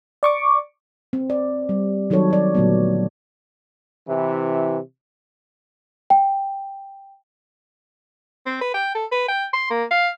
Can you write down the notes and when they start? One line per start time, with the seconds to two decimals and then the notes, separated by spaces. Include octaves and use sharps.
0.23 D5 C#6 D6
1.13 C4
1.30 D5
1.69 G3
2.10 D#3 F#3 D#4 A4 C#5
2.30 F#3 D5
2.55 A#2 D3 F#3 A3 B3
4.07 C3 E3
6.10 G5
8.46 C4
8.61 B4
8.74 G5
8.95 A4
9.12 B4
9.28 G5
9.53 C6
9.70 A#3
9.91 F5